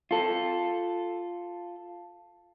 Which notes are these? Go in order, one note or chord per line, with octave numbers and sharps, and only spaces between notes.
F4 A4